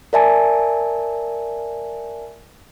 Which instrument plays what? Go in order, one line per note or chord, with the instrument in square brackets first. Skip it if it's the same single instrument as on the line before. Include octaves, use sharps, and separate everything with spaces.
[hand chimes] A#4 D5 E5 G#5 A5